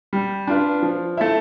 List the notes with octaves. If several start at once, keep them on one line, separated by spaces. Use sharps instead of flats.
G3
D4 F4 B4
F3
A3 E4